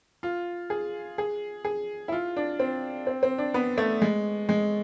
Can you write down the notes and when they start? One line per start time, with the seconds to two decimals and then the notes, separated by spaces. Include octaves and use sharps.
0.23 F4
0.70 G#4
1.18 G#4
1.65 G#4
2.08 E4
2.12 F4
2.37 D4
2.60 C4
3.07 C4
3.23 C4
3.38 D4
3.54 B3
3.78 A3
4.02 G#3
4.49 G#3